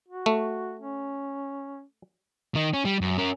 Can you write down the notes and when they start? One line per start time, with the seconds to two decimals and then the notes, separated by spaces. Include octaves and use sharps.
0.08 F#4
0.26 A3
0.79 C#4
2.55 D#3 D#4
2.73 C#4
2.85 G3
3.01 F#2
3.18 C#4 A#4